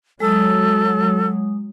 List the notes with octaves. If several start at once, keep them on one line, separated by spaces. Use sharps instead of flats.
F#3 G#3 A4 D#6